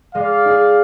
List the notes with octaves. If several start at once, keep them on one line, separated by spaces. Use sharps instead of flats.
G#3 D5 F5
D#4 G#4